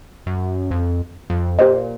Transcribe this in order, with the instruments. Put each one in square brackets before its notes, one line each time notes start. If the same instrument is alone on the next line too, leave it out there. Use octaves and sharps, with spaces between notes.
[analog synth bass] F#2
F2
F2
[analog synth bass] A#2 [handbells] G4 C5 D#5